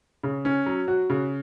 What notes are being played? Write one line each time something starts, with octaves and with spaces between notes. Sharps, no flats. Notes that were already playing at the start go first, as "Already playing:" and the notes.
C#3
C#4
F#3
F#4
C#3